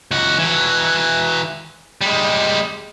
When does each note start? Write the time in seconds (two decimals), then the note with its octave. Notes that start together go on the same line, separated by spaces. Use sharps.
0.11 C#2 F#4
0.39 E3 F#4
2.01 G3 G#3